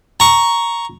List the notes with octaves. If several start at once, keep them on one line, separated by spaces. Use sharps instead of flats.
A#5 C#6